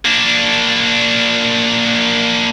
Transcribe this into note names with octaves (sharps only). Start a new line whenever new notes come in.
A#3 D4